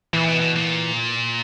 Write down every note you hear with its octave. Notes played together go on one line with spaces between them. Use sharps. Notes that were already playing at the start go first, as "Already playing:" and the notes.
A#2 E3
B2
B2
A#2